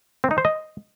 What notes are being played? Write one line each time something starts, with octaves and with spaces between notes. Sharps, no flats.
C4
D#4
C5
D#5